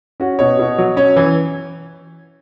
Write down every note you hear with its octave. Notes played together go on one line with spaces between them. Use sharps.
C#4 F#4
B2 C#5
B2
F#3
C#4 C#5
E3